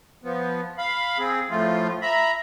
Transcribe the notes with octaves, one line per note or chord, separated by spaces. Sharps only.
F3 B3
F5 B5
C4 G#4
A2 F3 A3 F4
E5 A#5 B5